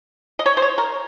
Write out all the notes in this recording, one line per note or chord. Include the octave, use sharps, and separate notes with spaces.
D#5
C#5
C5
C#5
A#4